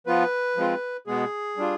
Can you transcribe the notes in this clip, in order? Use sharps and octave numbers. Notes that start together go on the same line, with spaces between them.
F3 B3 F4 B4
F3 G#3 C4 F4
B2 G#3 B3 G#4
G3 D4 F4